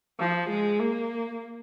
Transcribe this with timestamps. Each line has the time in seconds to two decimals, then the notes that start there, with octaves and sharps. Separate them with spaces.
0.19 F3
0.49 G#3
0.80 A#3